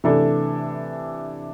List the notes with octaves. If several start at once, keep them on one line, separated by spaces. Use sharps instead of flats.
C3 E3 A3 D4 A4